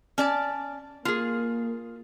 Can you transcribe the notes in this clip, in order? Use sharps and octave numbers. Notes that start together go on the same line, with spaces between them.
C#4 D5 A5
A#3 F4 G#4